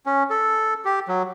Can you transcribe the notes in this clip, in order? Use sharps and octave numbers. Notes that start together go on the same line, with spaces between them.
C#4
A4
G4
F#3